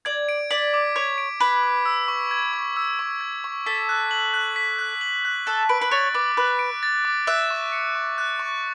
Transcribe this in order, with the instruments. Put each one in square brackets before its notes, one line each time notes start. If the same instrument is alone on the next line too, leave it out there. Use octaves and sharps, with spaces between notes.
[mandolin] D5 [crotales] G#6
[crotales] D7
[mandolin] D5 [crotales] B6
[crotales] D6
[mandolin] C#5 [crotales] G#6
[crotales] D7
[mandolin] B4 [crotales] B6
[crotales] D6
E6
C#6
G#6
C#6
E6
C#6
G#6
C#6
[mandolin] A4 [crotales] B6
[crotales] F#6
F#7
F#6
B6
F#6
F#7
F#6
[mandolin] A4 [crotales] F#6
[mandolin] B4 [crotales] D7
[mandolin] B4
[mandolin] C#5 [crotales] A6
[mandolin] B4 [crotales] D6
[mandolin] B4 [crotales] F#6
[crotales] D7
A6
D6
[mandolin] E5 [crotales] F#6
[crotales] C#6
C#7
C#6
F#6
C#6